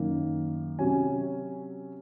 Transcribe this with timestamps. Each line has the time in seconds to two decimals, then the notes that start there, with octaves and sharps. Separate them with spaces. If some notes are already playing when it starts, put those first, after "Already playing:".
Already playing: F#2 D#3 A#3 D#4
0.79 C3 F#3 C#4 G#5